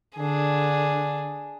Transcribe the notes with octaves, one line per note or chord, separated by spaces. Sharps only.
D3 D4 G#4